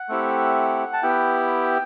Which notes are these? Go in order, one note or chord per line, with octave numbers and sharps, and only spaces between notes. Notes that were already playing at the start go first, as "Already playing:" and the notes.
Already playing: F#5
A3 C4 E4 G4
A5
B3 E4 G4 G5